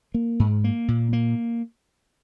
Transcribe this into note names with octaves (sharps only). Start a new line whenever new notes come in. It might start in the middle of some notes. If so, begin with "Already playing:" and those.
A#3
G#2
A#3
A#2
A#3